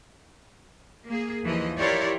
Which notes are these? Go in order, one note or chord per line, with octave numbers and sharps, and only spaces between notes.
A#3 G#4
D#2 E3 F3 D#5
E4 F4 G4 A#4 C#5 D5